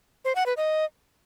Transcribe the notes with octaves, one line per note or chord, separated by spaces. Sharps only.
C5
F#5
B4
D#5